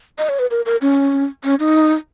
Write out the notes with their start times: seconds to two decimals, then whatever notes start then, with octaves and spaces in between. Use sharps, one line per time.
0.18 D#5
0.29 C#5
0.39 B4
0.51 A#4
0.66 A#4
0.81 C#4
1.44 C#4
1.60 D#4